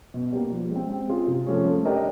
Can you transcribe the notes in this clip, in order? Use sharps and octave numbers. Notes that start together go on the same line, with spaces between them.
B2
G3 A#3
F3
G#3 C4
C4
F4 G#4
C3
F3 A3 C#4
A3
D4 G4 A#4 D#5